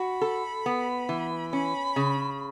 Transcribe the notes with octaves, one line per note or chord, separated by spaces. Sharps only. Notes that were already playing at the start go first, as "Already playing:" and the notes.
Already playing: F#4 B5
A4
B3
E3
C#4 B5
C#3